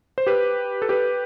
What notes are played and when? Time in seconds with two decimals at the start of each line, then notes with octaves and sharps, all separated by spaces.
0.18 C5
0.27 G4 B4
0.82 A4
0.89 G4 B4